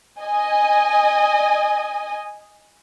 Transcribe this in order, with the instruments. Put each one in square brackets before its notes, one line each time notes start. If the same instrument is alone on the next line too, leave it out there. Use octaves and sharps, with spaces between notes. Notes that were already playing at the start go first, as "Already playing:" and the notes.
[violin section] D#5 G#5